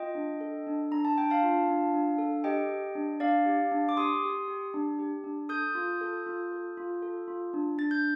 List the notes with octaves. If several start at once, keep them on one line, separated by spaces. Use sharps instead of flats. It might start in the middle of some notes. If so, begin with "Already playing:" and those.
Already playing: F4 D#5 G5
D4
A4
D4
D4 A#5
A5
D4 G5
F5 A5
F4
D4
D4
A4
G4 D#5 G5
G4
D4
D4 D5 F5
G4
D4
D6
G4 C6 D#6
G4
G4
D4
G4
D4
A4 D#6 G6
F4
A4
F4
A4
F4
A4
F4
D4
D4 A6
G6